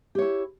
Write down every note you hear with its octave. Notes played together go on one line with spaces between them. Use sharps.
E4 G4 C#5